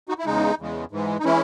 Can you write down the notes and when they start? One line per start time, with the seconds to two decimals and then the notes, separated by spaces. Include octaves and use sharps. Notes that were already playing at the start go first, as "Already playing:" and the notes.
0.09 D#4 F#4
0.19 E4
0.25 E2 C#3 G#3 D#4
0.59 E2 C#3 G#3
0.91 G#2 E3 G#3
1.19 D#4
1.25 E3 G#3 C#4 E4